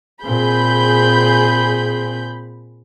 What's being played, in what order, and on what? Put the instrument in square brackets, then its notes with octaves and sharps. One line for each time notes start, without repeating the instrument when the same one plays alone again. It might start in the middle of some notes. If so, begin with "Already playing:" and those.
[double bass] A#2 C4 [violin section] G#4 B5 G6